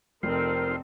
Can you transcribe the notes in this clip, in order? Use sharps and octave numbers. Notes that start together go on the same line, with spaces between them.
F1 C4 D#4 F4 A4 A#4 C5